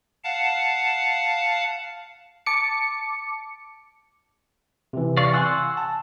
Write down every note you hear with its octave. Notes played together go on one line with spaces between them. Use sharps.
F5 F#5 A5
A5 D6 C#7
C3 E3
D5 F5 C#6
F#5 G#5 C6 C#6 E6 F#6
A5